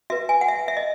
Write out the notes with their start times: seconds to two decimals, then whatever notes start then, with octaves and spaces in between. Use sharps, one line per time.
0.10 F#4 B4 E5
0.29 G#5
0.41 F#5
0.48 E5
0.68 E5
0.77 D#5